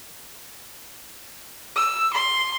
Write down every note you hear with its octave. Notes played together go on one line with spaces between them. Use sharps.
E6
C6